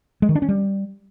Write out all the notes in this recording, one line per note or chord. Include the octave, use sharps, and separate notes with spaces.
G#3
D#3
D4
C#4
G3